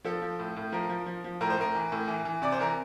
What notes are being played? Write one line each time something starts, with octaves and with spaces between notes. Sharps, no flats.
F3 A4
F3
A2
A2
F3 A#4
F3
F3
F3
A2 A#4
C5
A2 A#4
E3
A2
E3
E3
C3 D5
C5
E3 A#4